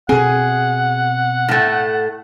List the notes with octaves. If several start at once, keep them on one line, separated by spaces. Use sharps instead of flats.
B2 C4 G#4 F#5
A2 A3